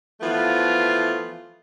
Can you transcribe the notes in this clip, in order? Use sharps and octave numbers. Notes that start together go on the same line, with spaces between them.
E3 F3 A3 B3 F4